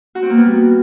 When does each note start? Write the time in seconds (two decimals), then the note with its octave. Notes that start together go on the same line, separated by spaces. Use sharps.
0.15 F#4
0.23 C4
0.30 A#3
0.37 B3
0.45 G3